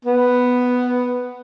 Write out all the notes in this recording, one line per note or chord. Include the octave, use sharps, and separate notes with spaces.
B3